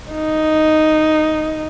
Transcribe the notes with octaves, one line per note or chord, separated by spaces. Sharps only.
D#4